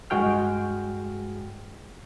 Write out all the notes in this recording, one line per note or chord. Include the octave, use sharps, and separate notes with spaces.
G2 G#3 F#4 G#4 G5 F6